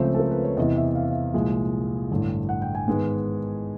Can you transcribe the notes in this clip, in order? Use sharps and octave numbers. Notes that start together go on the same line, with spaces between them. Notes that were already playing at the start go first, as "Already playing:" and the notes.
Already playing: C#2 C#3 F3 A3 C4 C5
A4
A#4
B4
C#5
E2 C3 E3 D#5
E5
F5
E5
F5
C2 A#2 F3 G#3
A1 G2 D3
F#5
G5
G#5
G#2 D#3 G#3 B3